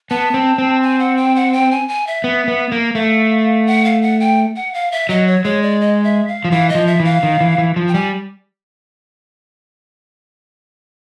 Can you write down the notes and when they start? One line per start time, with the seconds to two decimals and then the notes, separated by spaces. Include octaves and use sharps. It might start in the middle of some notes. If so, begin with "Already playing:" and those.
0.10 B3 A5
0.34 C4
0.58 C4
0.82 G#5
0.99 F#5
1.17 G5
1.36 F#5
1.53 G5
1.71 G#5
1.89 G#5
2.07 E5
2.24 B3
2.48 B3
2.72 A#3
2.95 A3 F5
3.67 F#5
3.85 F5
4.02 F#5
4.20 G5
4.56 F#5
4.74 F5
4.92 E5
5.09 F#3 D#5
5.27 C#5
5.44 G#3 C#5
5.62 D5
5.81 D#5
6.04 E5
6.28 F5
6.45 F3
6.52 E3 F5
6.69 D#5
6.75 F3
6.87 E5
7.00 E3 F5
7.23 D#3
7.41 E3
7.58 E3
7.76 F3
7.88 G5
7.94 G3 G#5